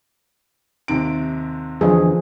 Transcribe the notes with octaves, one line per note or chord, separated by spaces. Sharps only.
D#2 C3 D7
E2 D3 F3 G#4